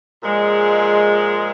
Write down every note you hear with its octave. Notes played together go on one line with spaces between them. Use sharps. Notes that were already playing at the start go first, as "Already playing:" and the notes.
A#2 F3 G#3